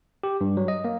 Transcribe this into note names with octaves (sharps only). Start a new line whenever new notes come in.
G4
G2
F#3
D#5
A#3